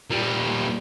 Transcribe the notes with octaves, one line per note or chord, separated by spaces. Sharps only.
A#2 G3